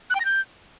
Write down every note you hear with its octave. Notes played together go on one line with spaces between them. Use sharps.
F#6
G5
A#6
G6